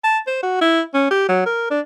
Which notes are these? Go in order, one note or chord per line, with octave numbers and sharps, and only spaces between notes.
A5
C5
F#4
E4
C#4
G4
F#3
A#4
D4